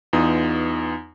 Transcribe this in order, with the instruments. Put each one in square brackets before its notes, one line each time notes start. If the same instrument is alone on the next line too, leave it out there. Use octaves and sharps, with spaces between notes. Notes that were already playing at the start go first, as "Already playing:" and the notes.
[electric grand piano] E2 B3 D#4 F4 D#6